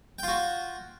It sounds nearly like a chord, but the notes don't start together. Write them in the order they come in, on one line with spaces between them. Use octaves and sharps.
G5 F4 F#4